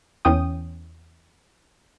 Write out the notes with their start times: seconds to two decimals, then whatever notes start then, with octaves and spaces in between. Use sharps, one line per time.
0.25 E2 C#4 G5 D#6